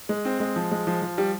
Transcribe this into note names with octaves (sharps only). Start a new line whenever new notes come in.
G#3
C4
G#3
F3
G#3
F3
F3
G3